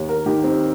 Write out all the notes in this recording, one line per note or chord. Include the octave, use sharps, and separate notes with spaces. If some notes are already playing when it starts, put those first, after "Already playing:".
Already playing: D#2
A#4
D#3 G4
C4